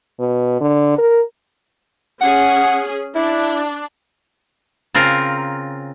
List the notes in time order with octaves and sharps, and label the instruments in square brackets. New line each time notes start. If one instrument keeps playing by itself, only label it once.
[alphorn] B2
D3
A#4
[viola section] C#4 G#4 [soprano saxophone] F#5
[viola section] D4 [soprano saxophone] E4
[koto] C#3 C4 F4 A#4